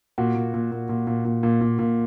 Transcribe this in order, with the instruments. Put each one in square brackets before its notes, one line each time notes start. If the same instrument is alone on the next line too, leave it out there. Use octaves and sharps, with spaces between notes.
[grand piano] A#2 F#4
A#2
A#2
A#2
A#2
A#2
A#2
A#2
A#2
A#2